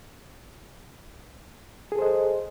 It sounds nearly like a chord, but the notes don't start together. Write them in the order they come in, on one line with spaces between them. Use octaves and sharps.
G#4 A4 C5 D#5